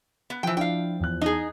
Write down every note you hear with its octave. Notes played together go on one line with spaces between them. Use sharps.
B3
E3 F3 G5
D4 E4 F5 G5
E2 F#6
D#4 G#4